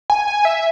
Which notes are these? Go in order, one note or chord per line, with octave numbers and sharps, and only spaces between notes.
G#5
G#5
E5